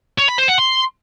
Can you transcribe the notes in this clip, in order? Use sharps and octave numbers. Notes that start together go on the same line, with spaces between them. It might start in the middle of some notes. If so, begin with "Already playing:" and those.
C#5
B5
C5
F#5
C6